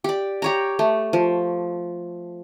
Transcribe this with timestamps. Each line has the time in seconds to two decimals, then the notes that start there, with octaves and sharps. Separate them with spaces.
0.04 G4 D5
0.42 G4 C#5 A#5
0.79 A3
1.13 F3